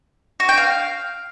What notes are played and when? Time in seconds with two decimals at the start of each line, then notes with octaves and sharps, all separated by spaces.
0.40 F#4
0.49 G5
0.58 F5